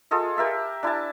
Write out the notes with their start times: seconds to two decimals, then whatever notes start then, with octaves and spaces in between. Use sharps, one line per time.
0.11 F4 G#4 A4 D#5
0.37 G4 A#4 E5 A5
0.83 D4 E4 G#5 A5